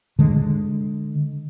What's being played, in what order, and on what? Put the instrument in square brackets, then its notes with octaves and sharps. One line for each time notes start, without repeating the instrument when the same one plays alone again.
[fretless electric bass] D3 G#3